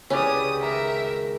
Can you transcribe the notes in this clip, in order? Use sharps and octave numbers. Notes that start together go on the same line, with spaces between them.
C#2 C#4 E4 G4 B4 D5 D#6
D#3 A#4 E5 A#5